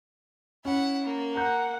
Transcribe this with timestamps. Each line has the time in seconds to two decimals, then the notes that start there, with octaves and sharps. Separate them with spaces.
0.65 C#4 E4 F#5
1.03 A#3
1.35 F#5 A#5 G6